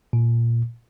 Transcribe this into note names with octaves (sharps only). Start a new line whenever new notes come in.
A#2